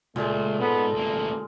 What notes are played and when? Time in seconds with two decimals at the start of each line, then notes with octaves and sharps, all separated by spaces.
0.16 C#2 A#2 G#3 A3
0.61 G#2 B3 A4
0.94 A1 D2 A#3